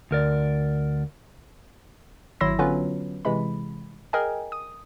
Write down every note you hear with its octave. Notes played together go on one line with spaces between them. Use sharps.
D2 A#4 D5
G#1 F#3 E4 C6 E6 A#6
D3 F#3 B3 C#4 F4 B4
C3 E3 G#3 B5
G#4 A#4 D#5 G5 G#5
D#6